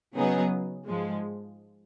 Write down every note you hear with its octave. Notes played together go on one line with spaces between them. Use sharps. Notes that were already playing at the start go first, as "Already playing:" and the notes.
C#3 F#3 B3 D#4 G#4
G#2 F3 G#3